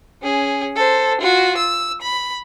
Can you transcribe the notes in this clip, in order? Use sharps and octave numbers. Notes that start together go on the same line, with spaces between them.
C#4 G#4
A4 C5
F4 F#4
E6
B5